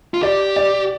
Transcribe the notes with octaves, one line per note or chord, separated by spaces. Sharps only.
F4
G4 D5
D5